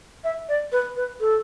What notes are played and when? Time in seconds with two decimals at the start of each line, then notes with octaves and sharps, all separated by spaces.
0.24 E5
0.49 D5
0.72 B4
0.96 B4
1.20 A4